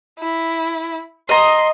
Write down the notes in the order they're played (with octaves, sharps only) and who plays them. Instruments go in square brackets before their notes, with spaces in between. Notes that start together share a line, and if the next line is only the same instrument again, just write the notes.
[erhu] E4
[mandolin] D#5 A#5 [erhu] C6